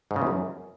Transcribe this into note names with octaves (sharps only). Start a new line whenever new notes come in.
G#2
C#3
E2
F#2